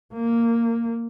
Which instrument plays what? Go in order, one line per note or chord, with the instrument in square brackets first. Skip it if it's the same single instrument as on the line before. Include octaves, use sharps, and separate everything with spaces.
[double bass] A#3